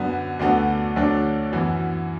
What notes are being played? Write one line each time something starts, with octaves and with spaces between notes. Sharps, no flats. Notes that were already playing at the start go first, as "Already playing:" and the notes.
Already playing: F#2 D3 B3
D2 D3 B3 F#4 A4
D2 D3 F#3 D4 A4
F#2 E3 B3